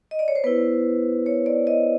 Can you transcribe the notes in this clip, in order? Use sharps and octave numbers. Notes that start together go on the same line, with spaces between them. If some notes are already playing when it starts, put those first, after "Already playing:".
D#5
D5
C#5
C5
B3 E4 B4
C#5
D5
D#5